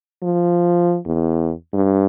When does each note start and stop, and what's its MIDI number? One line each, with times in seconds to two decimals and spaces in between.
0.23 0.98 53
1.06 1.53 40
1.73 2.06 43